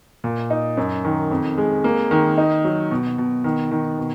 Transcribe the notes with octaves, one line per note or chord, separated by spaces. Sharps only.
A#2
D#4
F#2
D#3
F2
G#3
A#3
D#3
D#4
F#3
B2
B2
D#3
D#3
B2